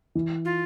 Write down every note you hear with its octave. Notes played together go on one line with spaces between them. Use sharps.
E3
F4